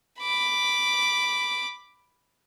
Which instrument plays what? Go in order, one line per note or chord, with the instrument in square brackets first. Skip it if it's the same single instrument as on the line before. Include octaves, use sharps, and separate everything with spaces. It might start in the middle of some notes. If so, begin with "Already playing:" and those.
[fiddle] B5 D6